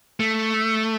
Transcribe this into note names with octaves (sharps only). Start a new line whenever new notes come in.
A3